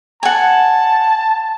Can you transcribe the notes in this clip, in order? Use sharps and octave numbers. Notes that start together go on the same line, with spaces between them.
F#5 G#5 A5